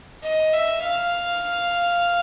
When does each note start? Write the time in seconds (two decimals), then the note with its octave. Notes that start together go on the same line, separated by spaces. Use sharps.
0.23 D#5
0.53 E5
0.83 F5